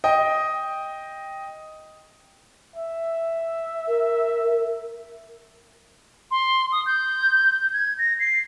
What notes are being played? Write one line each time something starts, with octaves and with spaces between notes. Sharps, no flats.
D#5 G5
E5
A#4
C6
D#6
G6
G#6
A#6
C7